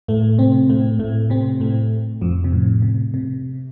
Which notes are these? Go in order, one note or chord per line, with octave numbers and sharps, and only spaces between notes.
A2 A3
C3 C4
A2 A3
A2 A3
C3 C4
A2 A3
F2 F3
C3
A2
C3
C3